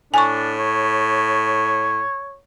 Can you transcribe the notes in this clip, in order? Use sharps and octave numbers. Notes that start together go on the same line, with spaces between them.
A2 D4 G#5 C#6
C#5